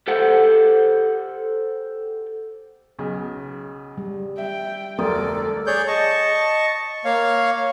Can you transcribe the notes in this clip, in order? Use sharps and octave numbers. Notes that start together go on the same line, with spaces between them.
G4 A4 C5 F#5
B1 C#3
G3
E5 G5
F1 D2 A4 A#4 D5 D#6
G#4 C#5 D5 G6
D#5 A5 C#6
A#3 C#5 F5